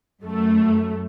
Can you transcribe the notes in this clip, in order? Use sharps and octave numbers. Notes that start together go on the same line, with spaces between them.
F#2 A3